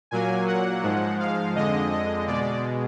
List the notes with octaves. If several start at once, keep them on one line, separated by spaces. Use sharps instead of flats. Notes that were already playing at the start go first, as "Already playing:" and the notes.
A#2 F#3 A#3 G#5
F#5
G#2 F3 G#3
F5
F2 D3 G#3 D#5
D#5
B2 G#3 D5